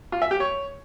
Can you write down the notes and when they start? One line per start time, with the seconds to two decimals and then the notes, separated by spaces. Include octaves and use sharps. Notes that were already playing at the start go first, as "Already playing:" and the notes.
0.12 F4
0.22 E5
0.31 G4
0.40 C#5